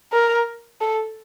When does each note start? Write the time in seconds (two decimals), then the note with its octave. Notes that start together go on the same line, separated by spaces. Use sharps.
0.13 A#4
0.81 A4